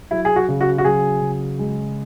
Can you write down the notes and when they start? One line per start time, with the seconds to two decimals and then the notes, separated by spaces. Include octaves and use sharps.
0.11 F#3 E4
0.25 G#4
0.36 F#4
0.49 C#3
0.61 F#4
0.78 F#4
0.85 F#3 G#4
1.21 C#3
1.59 G#3